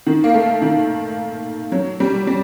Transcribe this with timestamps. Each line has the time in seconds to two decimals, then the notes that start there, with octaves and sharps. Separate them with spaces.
0.07 D#3
0.24 A#3
0.34 A3
0.62 D#3
1.72 F#3
2.00 G3
2.27 G3